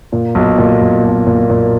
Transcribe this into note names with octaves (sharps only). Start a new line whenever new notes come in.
A#2
B1
A#2
B1
B1
A#2
A#2